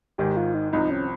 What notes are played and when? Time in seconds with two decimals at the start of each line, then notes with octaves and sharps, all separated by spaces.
0.18 G#1 G#2 D#3 G#3 G4
0.37 F4
0.54 D#4
0.72 C2 C3 F3 D#4
0.91 C#4